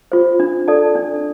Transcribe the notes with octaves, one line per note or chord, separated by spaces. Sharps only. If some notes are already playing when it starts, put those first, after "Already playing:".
F4 C5
D4
A4 D5 A5
D4